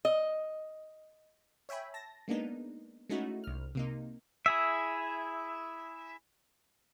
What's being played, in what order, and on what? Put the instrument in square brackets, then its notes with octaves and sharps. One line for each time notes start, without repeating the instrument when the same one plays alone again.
[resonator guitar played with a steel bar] D#5
[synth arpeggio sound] C#5 E5 G5 G#5 B5
A5 A#6
G#3 A#3 B3 D4 D#4
G#3 A3 C#4 D#4 E4 F#4
C2 F6
C3 A#3 D#4
[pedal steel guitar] E4 G#4 E5